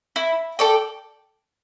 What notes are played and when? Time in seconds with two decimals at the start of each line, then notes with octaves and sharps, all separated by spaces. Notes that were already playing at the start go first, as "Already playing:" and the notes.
0.16 E4
0.59 A4 D5 G5